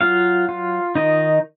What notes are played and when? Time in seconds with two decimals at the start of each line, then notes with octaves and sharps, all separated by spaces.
0.01 F#3 F4 F5
0.49 F4
0.95 D#3 D#4 D#5